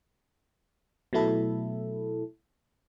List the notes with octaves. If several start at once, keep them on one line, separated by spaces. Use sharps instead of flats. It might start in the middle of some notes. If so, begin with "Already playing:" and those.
B2 F#3 A3 E4 A4